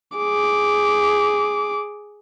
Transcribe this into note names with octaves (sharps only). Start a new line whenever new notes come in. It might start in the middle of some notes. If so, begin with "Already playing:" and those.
G#4 D6